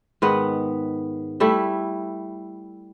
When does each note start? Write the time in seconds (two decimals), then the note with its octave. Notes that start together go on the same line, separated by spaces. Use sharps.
0.22 G#2 D#3 B3 B4
1.40 G3 A3 E4